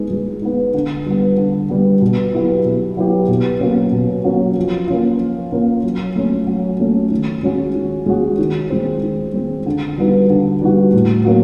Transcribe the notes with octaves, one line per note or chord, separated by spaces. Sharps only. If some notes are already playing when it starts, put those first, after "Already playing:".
Already playing: G#3 B3 D#4
G#3
B3 D#4
D3
G3 B3
D3
G3 B3
B2
F#3 B3 E4 G4
B2
F#3 B3 E4 G4
B2
F#3 A#3 C#4
B2
F#3 A#3 C#4
F3
A#3 C#4 F4
F3
A#3 C#4 F4
F#3
A3 C#4
F#3
A3 C#4
D#3
G#3 C#4 F#4
D#3
G#3 C#4 F#4
D#3
G#3 C4
D#3
G#3 C4
D3
G3 B3 D#4 F#4
D3
G3 B3 D#4 F#4
A2
F#3 A#3 C#4 F#4